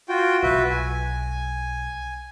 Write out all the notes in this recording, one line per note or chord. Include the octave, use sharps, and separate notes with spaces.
F4 F#4 G5
B1 F#4 B4 E5
G#5